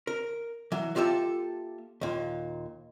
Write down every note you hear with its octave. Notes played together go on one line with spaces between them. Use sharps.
A#4
E3 F#3
A#3 F4 G4 A4 E5
D#2 A#2